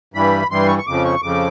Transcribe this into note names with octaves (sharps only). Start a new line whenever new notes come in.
G2 E3 G3 B5
G2 E3 G3 C6
C#6
C#6
F2 C#3 F3 D6
C#6
F2 C#3 F3 D6